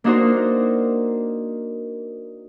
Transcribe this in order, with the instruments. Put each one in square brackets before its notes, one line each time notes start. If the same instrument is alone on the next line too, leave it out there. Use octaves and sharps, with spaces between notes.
[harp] A#3 D4 D#4 F#4 A#4 C5